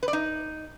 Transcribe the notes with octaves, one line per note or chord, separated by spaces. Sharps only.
B4
D5
D#4